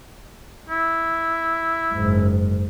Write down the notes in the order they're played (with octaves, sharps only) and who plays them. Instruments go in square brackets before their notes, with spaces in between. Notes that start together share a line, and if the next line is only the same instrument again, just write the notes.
[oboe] E4
[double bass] F#1 G#2